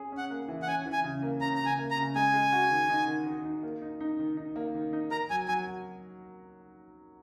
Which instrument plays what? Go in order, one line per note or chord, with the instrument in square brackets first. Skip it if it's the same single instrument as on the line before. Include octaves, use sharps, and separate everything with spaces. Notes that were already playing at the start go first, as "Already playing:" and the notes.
Already playing: [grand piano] C#4 G#4
C#4
[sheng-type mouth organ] F#5
[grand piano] A#3
E3
[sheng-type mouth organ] F#5
[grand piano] C#4 [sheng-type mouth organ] G#5
[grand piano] E3
[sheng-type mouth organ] G#5
[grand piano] C#3
A#3
[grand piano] C#4 [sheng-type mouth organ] A#5
[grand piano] C#3 [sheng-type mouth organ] A#5
[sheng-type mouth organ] G#5
[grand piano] A#3
[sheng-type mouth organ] A#5
[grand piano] C#3
[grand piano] G#3 [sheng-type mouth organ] G#5
[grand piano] G#3
F#4
D#3
D#4
D#3
D#3
D#4
A#3
D#4
D#4
D#3
D#4
A#3
D#3
D#4
[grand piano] A#4 [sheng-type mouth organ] A#5
[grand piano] F#3 [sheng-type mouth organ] G#5
[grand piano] F#3 [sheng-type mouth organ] G#5
[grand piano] F#4